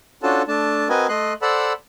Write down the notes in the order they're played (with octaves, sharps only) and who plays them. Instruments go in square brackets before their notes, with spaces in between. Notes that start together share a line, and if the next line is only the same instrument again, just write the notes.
[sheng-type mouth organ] C#4 D4 F4 F#4 A4 A5
A3 D4 A5
C4 F#4 A#4 B4 D#5 G#5
A3 D#5 C6 F#6
A4 C5 D5 F#5 B5 E6